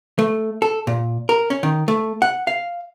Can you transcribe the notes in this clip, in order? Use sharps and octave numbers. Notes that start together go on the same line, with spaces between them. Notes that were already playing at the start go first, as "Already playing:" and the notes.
A3
A4
A#2
A#4
C#4
D#3
A3
F#5
F5